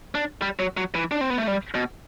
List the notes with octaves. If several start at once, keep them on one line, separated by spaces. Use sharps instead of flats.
D4
G3
F#3
F#3
E3
D4
C4
B3
A3
G3
B2